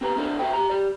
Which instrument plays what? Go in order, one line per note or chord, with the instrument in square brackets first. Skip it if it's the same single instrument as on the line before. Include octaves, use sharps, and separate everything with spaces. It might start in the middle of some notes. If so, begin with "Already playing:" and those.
[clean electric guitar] C4 G4 B4 A#5
C4 D4 E4 A4 C5 D5
F#4 C5 E5 G5
G4 A#5
G4 D5